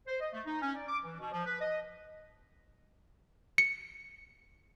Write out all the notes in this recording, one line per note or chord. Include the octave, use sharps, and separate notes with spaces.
C5
D#5
A3
D#4
C#4
D5
D6
E3
B2
F3
B4
D#5
C#7